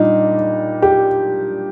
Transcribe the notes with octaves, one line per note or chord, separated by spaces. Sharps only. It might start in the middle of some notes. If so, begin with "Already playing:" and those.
Already playing: A#2 G3 D4 D#4
G4